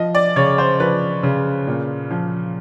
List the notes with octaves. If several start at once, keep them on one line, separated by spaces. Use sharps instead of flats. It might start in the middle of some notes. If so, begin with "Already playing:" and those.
Already playing: F3 D#5
D5
C#3 C#5
C5
F3 B4
C#3
A#2
F3